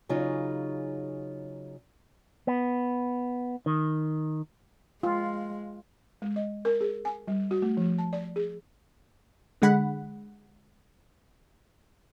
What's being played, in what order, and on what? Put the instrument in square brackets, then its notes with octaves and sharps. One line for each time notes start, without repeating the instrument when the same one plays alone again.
[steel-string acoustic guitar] C#3 F#3 D#4 F4 G#4
[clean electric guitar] B3
D#3
[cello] G#3 [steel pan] F4
[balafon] G#3
D#5
A#4
G#4
G#5
G3
F#4
A3
F3
A5
D5
G#4
[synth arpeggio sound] D3 G#3 F#5 B5